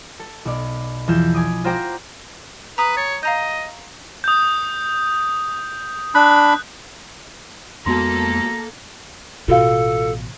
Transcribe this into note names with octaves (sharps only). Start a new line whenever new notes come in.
A4
B1 D5
E2 F3 G6 E7
G#5 D6 D#6
F4 F#4 C5 G5 A#5 D6
B4 A#5 D#6
C#5 A6
D#5 F5 A#5 G6
D#6 G6
D4 B5 F#6
F2 G#3 A#3 B3 F#4 A4 A#5 C6
A1 B2 F4 F#4 A4 F5